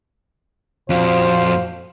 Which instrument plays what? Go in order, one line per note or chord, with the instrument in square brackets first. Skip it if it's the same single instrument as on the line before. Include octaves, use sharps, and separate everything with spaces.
[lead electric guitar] F2 [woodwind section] A#2 F#4 F5 [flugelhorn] C5